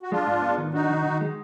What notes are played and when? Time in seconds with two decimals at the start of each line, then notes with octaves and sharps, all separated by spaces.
0.03 F#4
0.11 G#3 D4 F4
0.27 G#2
0.42 B3
0.58 D#3
0.73 D4 D#4 F#4
0.90 D#3
1.06 D#3
1.21 G#3